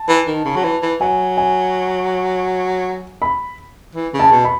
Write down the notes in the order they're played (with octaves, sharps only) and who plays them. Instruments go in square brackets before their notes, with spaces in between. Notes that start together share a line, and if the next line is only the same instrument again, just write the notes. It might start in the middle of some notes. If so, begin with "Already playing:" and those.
Already playing: [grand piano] A5
[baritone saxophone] E3
D#3
C#3
F#3
E3
E3
[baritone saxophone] F#3 [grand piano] G#5
[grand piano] G#5
B5
[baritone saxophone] E3
C#3
[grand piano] A5
[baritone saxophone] B2
[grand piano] B5